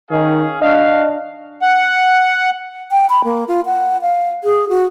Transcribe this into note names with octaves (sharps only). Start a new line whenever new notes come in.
D#3 C#4 G#4 F5
D4 F#4 D#5 F5
F#5
G5
B5
A#3
F4
F#5
F5
G#4
F#4